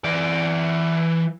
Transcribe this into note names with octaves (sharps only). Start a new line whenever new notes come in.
E3 D5